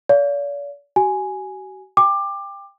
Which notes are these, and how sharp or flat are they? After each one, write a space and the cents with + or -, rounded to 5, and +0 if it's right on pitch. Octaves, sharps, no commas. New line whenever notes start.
D5 -45 F5 +0
F#4 +45 G#5 +0
G5 +25 D6 +20